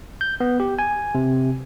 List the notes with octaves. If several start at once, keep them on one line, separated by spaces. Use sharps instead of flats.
G6
B3
G4
G#5
C3